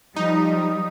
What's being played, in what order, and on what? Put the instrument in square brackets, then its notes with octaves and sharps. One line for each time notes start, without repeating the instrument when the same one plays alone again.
[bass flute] F3 [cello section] G3 [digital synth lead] D#4 [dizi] D#6